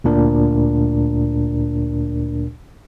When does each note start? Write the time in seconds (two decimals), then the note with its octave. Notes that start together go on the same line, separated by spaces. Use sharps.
0.04 D2 A#2 D4 A#4